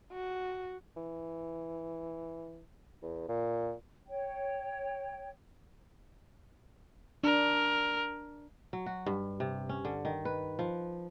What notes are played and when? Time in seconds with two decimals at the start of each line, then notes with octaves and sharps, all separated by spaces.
0.12 F#4
0.97 E3
3.02 E2
3.28 A#2
4.07 C#5 G5
7.24 D4 A#4
8.73 F#3
8.86 F#4
9.06 G2
9.40 C3
9.69 C#4
9.85 D3
10.05 D#3
10.25 B4
10.59 F3